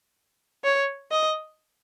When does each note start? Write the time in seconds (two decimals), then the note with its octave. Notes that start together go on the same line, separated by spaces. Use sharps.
0.64 C#5
1.11 D#5